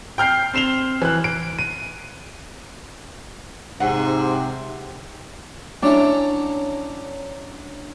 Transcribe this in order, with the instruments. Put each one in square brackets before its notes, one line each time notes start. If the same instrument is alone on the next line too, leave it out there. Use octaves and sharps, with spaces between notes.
[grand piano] G5 F6 G6 C7
C4 C7 E7 F7 G7
E3 F#6
D7
D#7
[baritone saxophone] G#2 [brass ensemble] C3 [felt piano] F#5
[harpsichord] F#3 C#4 E4 [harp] D4